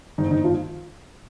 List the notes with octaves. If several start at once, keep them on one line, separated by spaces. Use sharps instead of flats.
G#2 D#3 D#4
D#3 D#4
D#3 F3 F4